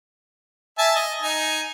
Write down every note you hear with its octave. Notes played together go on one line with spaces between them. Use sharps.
E5 G#5 A5
D#5
D#4 G#5